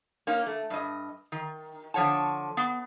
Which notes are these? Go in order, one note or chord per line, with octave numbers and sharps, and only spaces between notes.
A#3 C#4 D#4
A3
G2 D#5
D#3
D3 F3 C#5 F#5 A5
B3